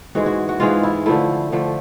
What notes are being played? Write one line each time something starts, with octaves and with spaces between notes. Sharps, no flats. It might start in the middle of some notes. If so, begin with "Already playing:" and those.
G#2 E3 G#3 F#4
F#4
F#4
G#2 E3 G#3 F4
E4
D3 F3 A3 E4
D3 F3 A3